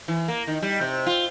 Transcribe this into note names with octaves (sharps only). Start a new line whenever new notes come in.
E3
A#3
D#3
G3
C3
F4